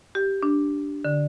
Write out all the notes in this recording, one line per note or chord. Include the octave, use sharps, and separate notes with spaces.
G4
D4
D3